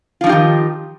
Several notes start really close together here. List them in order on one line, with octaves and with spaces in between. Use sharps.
F4 F3 D#4 G4 D#3